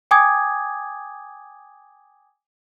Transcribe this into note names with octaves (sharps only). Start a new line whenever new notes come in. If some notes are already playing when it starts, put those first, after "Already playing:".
G5 G#5 D6 D#6 G#6